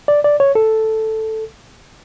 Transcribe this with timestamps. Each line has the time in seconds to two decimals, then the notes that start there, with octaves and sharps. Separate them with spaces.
0.08 D5
0.24 D5
0.40 C#5
0.55 A4